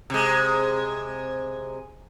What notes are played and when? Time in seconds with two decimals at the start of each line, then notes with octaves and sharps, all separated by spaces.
0.10 C3 G#3